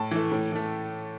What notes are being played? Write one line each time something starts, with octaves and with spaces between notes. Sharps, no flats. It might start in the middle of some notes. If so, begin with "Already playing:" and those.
Already playing: A2 A5
E3 A3
A2
E3 A3